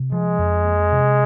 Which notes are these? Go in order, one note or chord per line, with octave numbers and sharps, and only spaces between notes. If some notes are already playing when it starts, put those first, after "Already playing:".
Already playing: C3
F3 G#3
F2
A#3
C3